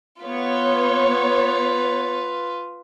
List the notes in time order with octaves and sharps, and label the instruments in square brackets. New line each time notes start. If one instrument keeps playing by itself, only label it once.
[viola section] B3 C#5 [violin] F4 B4